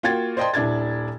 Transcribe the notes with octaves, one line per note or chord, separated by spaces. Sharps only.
A#3 F4 F#4 G5 G#6 A6
C5 D5 D#5 G5 A5 C6
D#1 D4 E4 G#6 A6